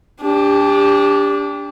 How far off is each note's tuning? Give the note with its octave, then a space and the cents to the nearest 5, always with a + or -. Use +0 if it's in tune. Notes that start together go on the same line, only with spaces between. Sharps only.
D4 -20 G4 +25